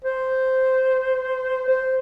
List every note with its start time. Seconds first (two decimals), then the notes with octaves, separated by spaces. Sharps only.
0.05 C5
1.68 C5